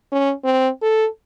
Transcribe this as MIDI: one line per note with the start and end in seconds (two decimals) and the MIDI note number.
0.12 0.33 61
0.44 0.69 60
0.82 1.07 69